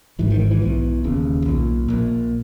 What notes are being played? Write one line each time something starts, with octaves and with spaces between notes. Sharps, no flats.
G#1 G#2 E3
D#3
E3
E3
B1 B2 E3
E1 D#2 C#3
B1 A#2
A#1 A#2